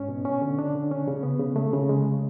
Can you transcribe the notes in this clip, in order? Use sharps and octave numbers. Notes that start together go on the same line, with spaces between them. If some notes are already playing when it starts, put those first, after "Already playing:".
Already playing: G#2 C#4
B2
C#4
D3
D4
D3
C#4
C#3
B3
C#3
A3
C#3
G#3